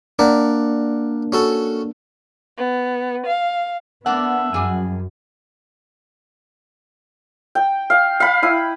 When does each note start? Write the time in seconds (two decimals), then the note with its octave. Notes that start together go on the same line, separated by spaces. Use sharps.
0.19 A#3 D4 A#4 D5 F#5
1.32 C#4 F#4 A4
2.58 B3
3.26 F5
4.06 B3 D4 A#4 D5 E5 F#5
4.54 F#2 G3 G#4 G#5
7.55 G5
7.90 F5
8.20 F5 B5
8.42 E4 D#6